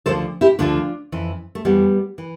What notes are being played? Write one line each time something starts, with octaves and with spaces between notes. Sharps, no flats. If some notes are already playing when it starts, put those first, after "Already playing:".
D2 D3 F3 A4 C5
E4 G4
D2 D3 F3 D4 F4
F2 E3
A3
F2 E3 G3 B3
E3